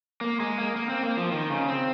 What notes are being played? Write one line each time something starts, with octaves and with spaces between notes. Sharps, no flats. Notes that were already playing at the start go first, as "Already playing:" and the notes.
A#3
G#3
A#3
A#3
C4
A#3
F3
D#3
C#3
C4